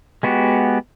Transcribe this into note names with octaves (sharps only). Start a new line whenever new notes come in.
G#3 B3 F#4 G4